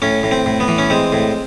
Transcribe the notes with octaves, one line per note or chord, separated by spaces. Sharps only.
A2 C#4
A2
C4
A2
B3
E3
C#4
G#3 C4
A2